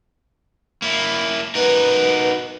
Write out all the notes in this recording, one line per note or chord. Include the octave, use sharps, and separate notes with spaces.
A#3 E4
D#4 F#4 A#4 B4